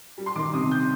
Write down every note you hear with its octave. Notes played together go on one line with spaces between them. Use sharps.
G3
C6
D#3 D6
C3 D#6
G6